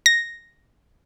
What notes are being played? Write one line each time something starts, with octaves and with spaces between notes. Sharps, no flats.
A#6